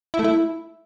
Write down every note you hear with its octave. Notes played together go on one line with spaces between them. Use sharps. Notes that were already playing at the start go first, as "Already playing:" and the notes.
E4
A3
E4